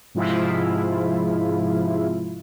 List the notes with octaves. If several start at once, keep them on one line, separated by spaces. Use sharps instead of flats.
G#2 C3 F3 G#3 E4 F4